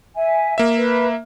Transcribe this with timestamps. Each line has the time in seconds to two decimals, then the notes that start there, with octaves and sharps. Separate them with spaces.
0.16 E5 G#5
0.58 A#3 E5
0.76 B4